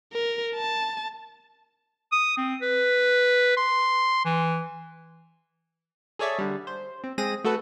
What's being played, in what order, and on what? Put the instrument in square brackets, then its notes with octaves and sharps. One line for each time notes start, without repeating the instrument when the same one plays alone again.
[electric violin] A#4
A5
[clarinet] D#6
C4
B4
C6
E3
[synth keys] G#4 A4 C#5 D5 E5
D3 G3
C5
C4
G#3 C4 G#4 A#6 D#7
A3 F#4 A4 B4